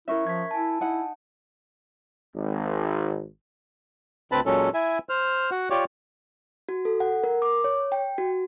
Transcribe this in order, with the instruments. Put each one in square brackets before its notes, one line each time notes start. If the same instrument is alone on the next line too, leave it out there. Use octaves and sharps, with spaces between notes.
[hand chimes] C#4 C#6 [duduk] E4 [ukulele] A#4 E5
[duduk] F3 [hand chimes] G#6 B6
[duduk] E4 [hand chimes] G#5 A5
[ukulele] D#4 F#5 [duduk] E4
[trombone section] G#1
[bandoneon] D2 C4 B4 A5 B5
A#2 F#3 G#3 C#4 A4
E4 E5 G#5
C5 F6
F#4 F#5
F4 G4 C#5 D5
[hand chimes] F#4
A4
F#5
A#4
D6
C#5
G5
F#4